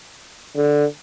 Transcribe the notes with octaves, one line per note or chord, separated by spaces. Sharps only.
D3